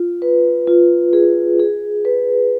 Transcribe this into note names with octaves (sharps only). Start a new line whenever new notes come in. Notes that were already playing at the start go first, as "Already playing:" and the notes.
Already playing: F4
B4
F4
G#4
G#4
B4